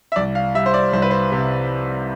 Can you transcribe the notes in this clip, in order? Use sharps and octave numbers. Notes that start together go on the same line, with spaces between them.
E5
C2 D5
F5
G3 E5
C5
D5
C2 C5
B4
C5
C3